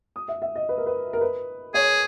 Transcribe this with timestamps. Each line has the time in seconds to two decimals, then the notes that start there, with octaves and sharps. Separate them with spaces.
0.16 D#6
0.28 E5
0.42 E5
0.55 D#5
0.69 B4
0.78 A#4
0.86 B4
1.13 A#4
1.21 B4
1.74 G#4 C#5